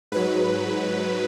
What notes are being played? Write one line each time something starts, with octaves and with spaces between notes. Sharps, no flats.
G#2 F#3 B4